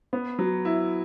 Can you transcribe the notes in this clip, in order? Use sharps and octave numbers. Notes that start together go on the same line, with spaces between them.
B3
F#3
E4